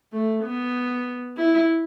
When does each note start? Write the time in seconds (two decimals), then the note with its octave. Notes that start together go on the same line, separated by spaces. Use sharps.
0.13 A3
0.44 B3
1.37 E4